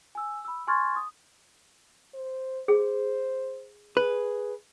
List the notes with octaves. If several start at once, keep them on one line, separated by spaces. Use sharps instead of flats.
G#5 E6
B5 E6
G#5 C6 C#6 F6 G#6 A6
D#6
C5
G#4 C5
G#4 B4